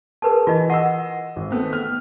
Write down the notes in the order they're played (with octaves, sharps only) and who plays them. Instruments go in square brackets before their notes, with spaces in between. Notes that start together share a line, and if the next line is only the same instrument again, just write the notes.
[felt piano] G#4 [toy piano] A#4 B4 A5
[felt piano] E3 [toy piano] F4 D#5
[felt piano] D#5 E6 [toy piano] F#5
[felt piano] G#1
A3 B3 C4
F6